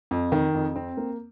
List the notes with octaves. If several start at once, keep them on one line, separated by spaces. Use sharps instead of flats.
F2
D#3
F2
C4
A#3